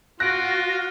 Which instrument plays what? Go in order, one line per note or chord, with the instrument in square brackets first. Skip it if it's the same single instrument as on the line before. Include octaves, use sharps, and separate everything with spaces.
[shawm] F4 [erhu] F#4 [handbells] F#6 D7 [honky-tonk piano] A#6